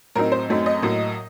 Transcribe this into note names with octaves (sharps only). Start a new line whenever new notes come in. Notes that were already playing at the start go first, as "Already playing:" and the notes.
A2 F#3 C4 D#4 A#4
C5
F#2 F#3 A3 C4 D#4
D#5
A2 F#3 A#3